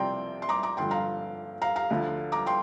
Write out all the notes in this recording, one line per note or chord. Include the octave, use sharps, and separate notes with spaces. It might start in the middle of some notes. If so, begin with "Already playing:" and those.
Already playing: C2 C3 F3 D5 G5 A#5 C6
C6
A#5 D6
A#5 D6
G2 D3 F3 G5 C6
F5 A#5
F5 A#5
F5 A#5
D2 D3 F3
A#5 D6
G5 C6